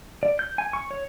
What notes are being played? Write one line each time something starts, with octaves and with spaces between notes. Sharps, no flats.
D5
G6
G#5
C#6
C#5